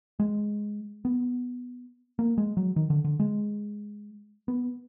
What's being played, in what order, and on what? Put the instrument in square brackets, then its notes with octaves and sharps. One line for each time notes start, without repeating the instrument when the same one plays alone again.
[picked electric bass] G#3
B3
A#3
G#3
F#3
D#3
D3
D3
G#3
B3